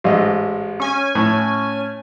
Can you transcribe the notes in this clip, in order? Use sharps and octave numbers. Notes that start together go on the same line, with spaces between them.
A1 G#2 D#5
C#4 G#5
A2